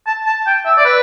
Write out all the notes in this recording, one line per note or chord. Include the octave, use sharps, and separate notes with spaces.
A5
A5
G5
E5
D5
B4